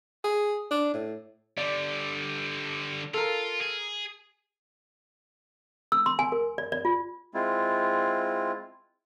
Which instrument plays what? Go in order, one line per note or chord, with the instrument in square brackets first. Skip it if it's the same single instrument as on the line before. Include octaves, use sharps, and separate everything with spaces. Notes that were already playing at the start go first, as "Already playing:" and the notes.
[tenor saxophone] G#4
D4
A2
[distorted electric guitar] D3 G3 [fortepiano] D5
[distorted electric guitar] F4 [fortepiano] A4 A#4
[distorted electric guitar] G#4
[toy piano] E6
C6
G#5
A#4
D5
D5
F4
[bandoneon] G#3 C4 E4 F4